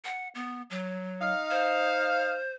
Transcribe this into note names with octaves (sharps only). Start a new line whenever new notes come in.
F#5
B3
F#3
D#4 F5
C5